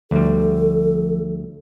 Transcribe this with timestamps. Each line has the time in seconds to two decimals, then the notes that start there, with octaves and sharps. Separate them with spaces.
0.11 D2 F3 G3 A4